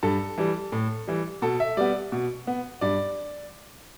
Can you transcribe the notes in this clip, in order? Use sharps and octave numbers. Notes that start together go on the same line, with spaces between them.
G2 A4
E3 G3
A2
E3 G3
B2 A4
E5
G3 B3 D5
B2
B3
G2 D5